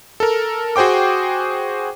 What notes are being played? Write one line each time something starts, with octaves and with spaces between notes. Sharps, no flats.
A4 A#4
F#4 G#4 C5 G5 D6